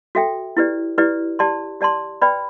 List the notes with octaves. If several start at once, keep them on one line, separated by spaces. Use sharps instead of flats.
F#4 A4 E5 G5
E4 G4 B4 D5
E4 G4 B4 D5
G4 D5 A5 C6
G4 D5 A5 C6
B4 D5 G5 B5